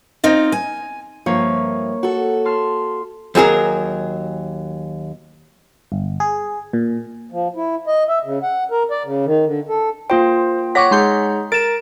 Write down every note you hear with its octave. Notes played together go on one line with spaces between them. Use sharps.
C4 D#4 F4
G#5
G2 F3 A#3 C#5 E5
F#4 A4
A5 C6 F6
D#2 F#3 G#4 A#4
G1
G#4
A#2
F3
E4
D#5
E5
C#3
F#5
A#4
D5
C#3
D#3
D3
A4
A#3 F4 C5 G5
C#5 F#5 C#6 D6 A#6 B6
G#3 D#4 G#4 C6 G6
A#4 A6 D7 E7